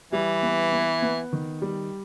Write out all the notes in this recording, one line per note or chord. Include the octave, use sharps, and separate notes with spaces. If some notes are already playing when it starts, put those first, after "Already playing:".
E3 G3
B3
B3
B3
D#3
G3